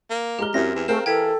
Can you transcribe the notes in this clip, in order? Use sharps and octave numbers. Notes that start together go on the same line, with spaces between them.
A#3
G#3 G4 A#5 F6 G7
F#2 C4 E4 G4 A#6
E2
A3 C4 G#4 A#4 F5 E7
E3 A4 G5 G#6 B6